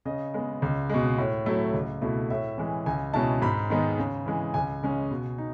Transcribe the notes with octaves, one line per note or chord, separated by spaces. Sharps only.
C#3 D#5
G#3 B3
C#2
B2 G#3
A2
F#3 A3 E4
C#2
B2 A3 E4
A2 E5
E3 G#3
C#2 G#5
B2 G#3 C#4 E4 A5
G#2 B5
D#3 G#3 B3
C#3
E3 G#3
C#2 G#5
C#3 G#3 C#4
B2
D#4